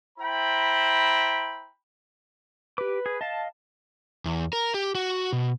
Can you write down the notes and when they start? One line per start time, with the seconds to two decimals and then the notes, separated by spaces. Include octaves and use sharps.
0.19 E4 C5 G5 A#5 B5
2.78 G4 B4 D6
3.06 G#4
3.21 D#5 F5 A5
4.25 E2
4.53 A#4
4.74 G4
4.95 F#4
5.33 B2